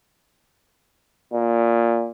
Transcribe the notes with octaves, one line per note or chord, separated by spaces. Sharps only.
A#2